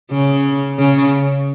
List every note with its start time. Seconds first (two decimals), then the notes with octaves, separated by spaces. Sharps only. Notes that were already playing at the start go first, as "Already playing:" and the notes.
0.11 C#3
0.79 C#3